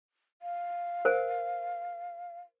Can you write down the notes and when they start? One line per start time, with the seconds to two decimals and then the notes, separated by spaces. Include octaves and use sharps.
0.42 F5
1.05 A#4 C5 G#5